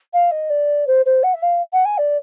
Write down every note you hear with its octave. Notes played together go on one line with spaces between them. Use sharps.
F5
D#5
D5
C5
C5
F#5
E5
F5
F#5
G#5
D5